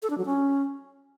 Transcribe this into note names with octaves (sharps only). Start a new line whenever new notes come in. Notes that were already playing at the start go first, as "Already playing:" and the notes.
A4
D4
F#3
C#4